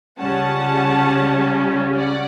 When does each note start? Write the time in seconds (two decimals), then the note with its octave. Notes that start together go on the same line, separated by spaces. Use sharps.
0.20 C#2 C#3 G3 C#4 F#5 A5
1.96 D5 F#5